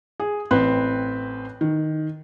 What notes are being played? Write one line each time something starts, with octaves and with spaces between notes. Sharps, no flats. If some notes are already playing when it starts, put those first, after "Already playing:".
G#4
A1 C4 B4
D#3